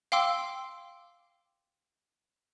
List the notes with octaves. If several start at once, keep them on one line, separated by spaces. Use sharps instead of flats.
F5 G5 C6 D6 E6